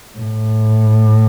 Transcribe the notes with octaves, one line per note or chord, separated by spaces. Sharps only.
A2